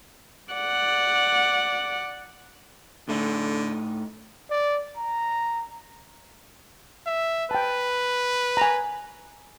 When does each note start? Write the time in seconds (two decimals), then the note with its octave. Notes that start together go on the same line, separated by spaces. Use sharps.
0.53 D5 F#5
3.09 A2 D3 A3 D#4
4.51 D5
4.97 A#5
7.06 E5
7.51 B4 G5 A5
8.57 G#5 A#5